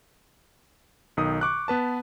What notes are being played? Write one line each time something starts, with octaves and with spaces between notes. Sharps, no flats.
B1 D#3 D#6
C#6 D6 F#6
B3 B4 A5